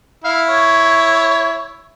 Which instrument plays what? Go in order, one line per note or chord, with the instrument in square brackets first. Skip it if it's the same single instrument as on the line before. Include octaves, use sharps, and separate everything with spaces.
[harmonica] E4 [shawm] F5
[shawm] C#5